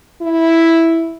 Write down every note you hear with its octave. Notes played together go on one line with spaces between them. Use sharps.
E4